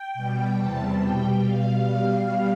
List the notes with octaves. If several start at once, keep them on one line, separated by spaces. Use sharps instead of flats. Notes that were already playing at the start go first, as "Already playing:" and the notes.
Already playing: G5
B2 G3
E2 C3 G3 A5
B2 G3 G5
B2 G3 F5
B2 G3 F5